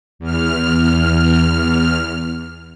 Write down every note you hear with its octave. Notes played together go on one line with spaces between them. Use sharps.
E2 F6